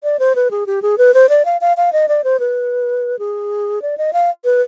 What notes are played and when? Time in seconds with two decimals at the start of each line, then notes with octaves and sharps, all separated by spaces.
0.04 D5
0.19 C5
0.36 B4
0.51 G#4
0.67 G4
0.82 G#4
0.98 B4
1.14 C5
1.29 D5
1.45 F5
1.61 F5
1.77 F5
1.93 D#5
2.08 D5
2.24 C5
2.40 B4
3.19 G#4
3.82 D5
3.98 D#5
4.13 F5
4.45 B4